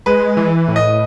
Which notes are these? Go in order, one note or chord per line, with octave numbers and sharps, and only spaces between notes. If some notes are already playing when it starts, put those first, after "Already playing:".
G#3 B4
E3
A2
D#5